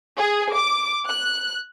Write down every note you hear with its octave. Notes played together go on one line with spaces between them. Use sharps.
G#4
D6
F#6